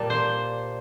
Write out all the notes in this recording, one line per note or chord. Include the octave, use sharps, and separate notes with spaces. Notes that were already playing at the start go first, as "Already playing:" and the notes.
Already playing: A#2 G3 A#3 A5
C5